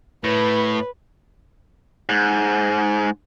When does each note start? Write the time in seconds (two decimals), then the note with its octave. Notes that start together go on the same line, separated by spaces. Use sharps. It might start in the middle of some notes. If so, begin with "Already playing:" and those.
0.24 A2 B4
2.09 G#2